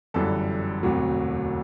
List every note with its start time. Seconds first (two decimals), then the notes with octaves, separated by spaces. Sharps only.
0.14 G1 F#2 E3 G3 A4
0.83 E1 D2 C3 F#3